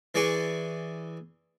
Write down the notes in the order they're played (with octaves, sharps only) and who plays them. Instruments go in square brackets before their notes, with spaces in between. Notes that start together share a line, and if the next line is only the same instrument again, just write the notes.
[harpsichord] E3 G#4 D5 G#5 C#6